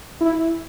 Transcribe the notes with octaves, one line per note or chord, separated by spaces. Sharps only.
E4